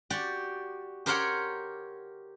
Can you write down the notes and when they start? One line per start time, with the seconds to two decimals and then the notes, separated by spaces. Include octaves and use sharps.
0.10 F#4 G4 D5
1.06 G4 A#4 C5 C#5 F#5 G5